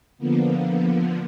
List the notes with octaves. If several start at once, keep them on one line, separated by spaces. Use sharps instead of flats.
D3 F3 A#3 B3